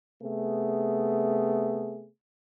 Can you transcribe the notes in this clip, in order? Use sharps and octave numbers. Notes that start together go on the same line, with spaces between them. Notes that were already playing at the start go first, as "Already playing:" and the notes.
C3 A3 B3 G#4